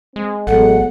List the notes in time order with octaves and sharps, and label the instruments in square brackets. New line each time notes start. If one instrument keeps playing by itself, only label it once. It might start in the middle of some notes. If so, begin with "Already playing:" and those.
[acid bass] G#3 [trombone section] C4
[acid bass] A1 [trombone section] F#3 G#3 A3 [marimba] B3 A4 [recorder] F#5